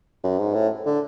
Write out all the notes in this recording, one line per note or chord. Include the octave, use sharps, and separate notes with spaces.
F#2
G#2
A2
D3